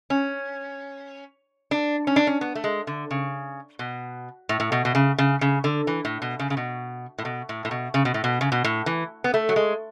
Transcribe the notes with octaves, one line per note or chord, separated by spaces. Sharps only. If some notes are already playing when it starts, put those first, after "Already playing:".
C#4
D4
C#4
D4
C#4
B3
A3
G#3
D3
C#3
B2
A2
A2
B2
B2
C#3
C#3
C#3
D3
E3
A2
B2
C#3
C#3
B2
A2
B2
A2
A2
B2
C#3
B2
A2
B2
C#3
B2
A2
E3
B3
A3
F#3
G#3